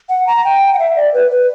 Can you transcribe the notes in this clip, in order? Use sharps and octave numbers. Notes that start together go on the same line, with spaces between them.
F#5
A#5
G5
F#5
E5
D5
B4
B4